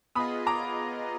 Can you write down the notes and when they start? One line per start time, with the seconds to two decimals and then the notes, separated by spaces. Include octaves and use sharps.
0.15 B3 F4 G#4 D#5 B5 D#6
0.47 A#5 D6